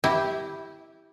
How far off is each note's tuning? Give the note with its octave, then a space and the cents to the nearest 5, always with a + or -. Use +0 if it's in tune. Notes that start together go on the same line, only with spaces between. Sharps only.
E4 -10 G4 +0